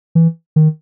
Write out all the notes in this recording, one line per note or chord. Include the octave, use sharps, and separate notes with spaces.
E3
D#3